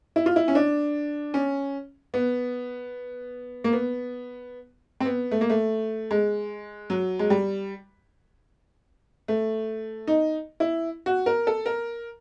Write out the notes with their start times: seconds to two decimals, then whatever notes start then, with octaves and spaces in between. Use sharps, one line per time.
0.16 E4
0.26 F4
0.36 E4
0.48 C#4
0.55 D4
1.34 C#4
2.14 B3
3.64 A#3
3.73 B3
5.00 C4
5.05 B3
5.31 A3
5.41 A#3
5.50 A3
6.11 G#3
6.90 F#3
7.19 G#3
7.30 G3
9.28 A3
10.07 D#4
10.60 E4
11.06 F#4
11.26 A#4
11.47 A4
11.66 A#4